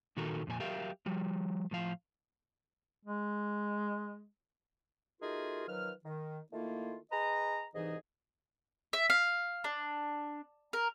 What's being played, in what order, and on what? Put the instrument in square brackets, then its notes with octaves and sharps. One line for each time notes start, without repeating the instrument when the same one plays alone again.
[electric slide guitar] A#2 D#3 D#4 F#4 A4 A#4
F2 A#2 D4 G#5
F#3 G4 A#4 E5 F5
F3 G3
A2 F3 F5
[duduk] G#3
[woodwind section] A3 D#4 F4 F#4 G#4 A#4
D#3 F3 F#3 B4 F6
D#3
D#3 A3 A#3 E4 F4
G#4 B4 D#5 A#5
C2 G#2 E3 D#4 G#4 D#5
[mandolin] E5
F5
D4
A#4